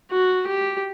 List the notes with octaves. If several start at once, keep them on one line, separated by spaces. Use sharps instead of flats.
F#4
G4